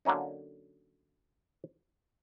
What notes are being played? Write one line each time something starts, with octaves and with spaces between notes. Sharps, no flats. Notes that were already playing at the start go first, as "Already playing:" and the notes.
D3 F#3 A#3 C#4 D#4